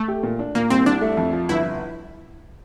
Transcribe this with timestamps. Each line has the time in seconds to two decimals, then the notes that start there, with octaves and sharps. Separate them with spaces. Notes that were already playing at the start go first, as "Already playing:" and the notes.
Already playing: A3
0.08 G4
0.23 A#2
0.39 D4
0.55 A#2 A#3
0.70 C2 C4
0.86 C2 D4
1.01 A3
1.17 F2
1.33 F3
1.49 G1 E4